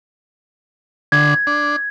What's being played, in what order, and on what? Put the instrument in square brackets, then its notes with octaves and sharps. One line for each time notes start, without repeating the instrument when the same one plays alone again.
[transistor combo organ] D3 [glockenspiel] G#6
[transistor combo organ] D4